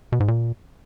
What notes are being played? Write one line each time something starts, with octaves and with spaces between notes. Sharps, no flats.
B2
G#2
A#2